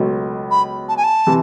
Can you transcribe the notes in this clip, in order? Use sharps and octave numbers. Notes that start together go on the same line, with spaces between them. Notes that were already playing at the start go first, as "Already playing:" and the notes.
Already playing: C#2 B2 F#3 A3
B5
A5
G#5
A5
C3 E3